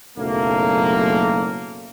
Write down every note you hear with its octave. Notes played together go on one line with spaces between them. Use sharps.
F#1 B1 A3 A#3